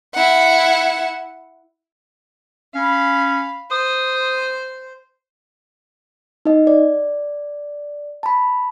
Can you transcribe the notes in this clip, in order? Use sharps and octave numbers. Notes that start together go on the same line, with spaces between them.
E4 F#5
C#4 F5 B5
C5 D#6
D#4 D#5
D5
A5 B5